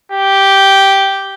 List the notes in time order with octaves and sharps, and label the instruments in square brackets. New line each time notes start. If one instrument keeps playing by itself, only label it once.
[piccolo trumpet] G4